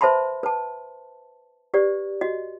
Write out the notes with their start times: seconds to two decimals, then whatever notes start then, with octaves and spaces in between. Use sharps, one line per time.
0.01 B4 C5 E5 A5 B5 C6
0.43 B4 A5
1.74 G4 B4 D5
2.21 F#4 D#5